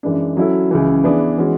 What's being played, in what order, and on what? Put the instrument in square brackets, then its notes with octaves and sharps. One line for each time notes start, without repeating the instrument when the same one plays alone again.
[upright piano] F#2 E3 G#3 D4
F#3 C#4 E4 A4
C#2 C#3 E3
E3 B3 D4 G#4 B4
E3 G#3 C#4 F#4